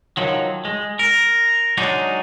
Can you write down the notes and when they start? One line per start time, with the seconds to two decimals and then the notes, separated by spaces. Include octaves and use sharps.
0.17 D#3 F3 F#3
0.65 G#3
0.99 A#4
1.78 F#3 G#3 D4 D#4